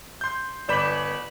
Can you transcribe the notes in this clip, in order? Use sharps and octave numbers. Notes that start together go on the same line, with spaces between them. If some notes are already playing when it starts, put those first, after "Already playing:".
C6 G6
G1 B4 D5 B5 G6 E7